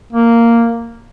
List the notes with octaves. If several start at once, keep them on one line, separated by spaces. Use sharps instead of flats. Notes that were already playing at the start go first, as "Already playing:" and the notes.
A#3